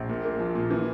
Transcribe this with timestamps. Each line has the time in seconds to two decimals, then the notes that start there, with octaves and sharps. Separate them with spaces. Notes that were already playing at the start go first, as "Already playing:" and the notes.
Already playing: A#1
0.09 A#2
0.24 A#3
0.39 F3
0.55 A#2
0.71 E3